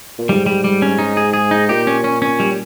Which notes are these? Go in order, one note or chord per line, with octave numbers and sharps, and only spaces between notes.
A#2
G#2 G3
G3
G3
C#4
D#4
G#4
G#4
D#4
A#2 G4
C#4
C#4
C#4
G3